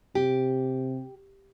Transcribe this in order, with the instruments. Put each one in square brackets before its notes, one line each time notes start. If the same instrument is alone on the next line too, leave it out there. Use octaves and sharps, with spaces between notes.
[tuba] C3 [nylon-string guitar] G4